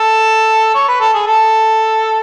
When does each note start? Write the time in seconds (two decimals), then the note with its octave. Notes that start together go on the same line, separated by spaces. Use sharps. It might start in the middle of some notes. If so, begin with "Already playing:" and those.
Already playing: A4
0.75 C#5
0.88 B4
1.00 A4
1.14 G#4
1.26 A4